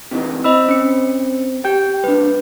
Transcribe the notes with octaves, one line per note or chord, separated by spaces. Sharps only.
C3 E3 D#4
C4 D#5 B5 E6
C#4 C#7
G4 G5 G6
C2 D4 B4